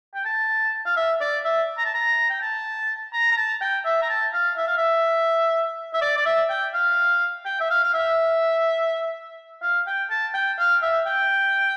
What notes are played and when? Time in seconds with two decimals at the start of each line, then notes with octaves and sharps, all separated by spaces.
0.15 G5
0.25 A5
0.86 F5
0.97 E5
1.21 D5
1.45 E5
1.78 A#5
1.85 A5
1.94 A#5
2.30 G5
2.41 A5
3.13 A#5
3.31 A#5
3.37 A5
3.61 G5
3.85 E5
4.02 A#5
4.09 A5
4.33 F5
4.57 E5
4.67 F5
4.77 E5
5.94 E5
6.01 D5
6.17 D5
6.26 E5
6.50 G5
6.74 F5
7.46 G5
7.60 E5
7.70 F5
7.84 F5
7.94 E5
9.62 F5
9.87 G5
10.10 A5
10.34 G5
10.59 F5
10.82 E5
11.06 G5